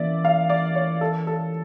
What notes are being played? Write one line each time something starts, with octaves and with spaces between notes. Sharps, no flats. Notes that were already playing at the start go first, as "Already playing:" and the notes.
Already playing: E3 A#3 C#4 D5 E5
F5
D5
C#5
A4
A4